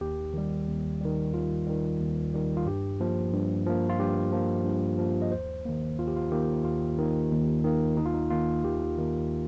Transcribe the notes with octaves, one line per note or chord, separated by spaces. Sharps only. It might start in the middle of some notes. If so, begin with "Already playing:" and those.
D#2 G4
D#3 G3
D#2
D#3 G3
D#2 F4
D#3 G3
D#2
D#3 G3
F4
G2 G4
F3 A#3
G2
F3 A#3
F4
G2 G4
F3 A#3
G2
F3 A#3
D#5
D#2 C5
D#3 A#3
D#2 F4
G4
F4
D#3 A#3 G4
D#2 F4
D#3 A#3
D#2
D#3 A#3
D#2 D#4
F4
D#4
D#3 A#3 F4
D#2 G4
D#3 A#3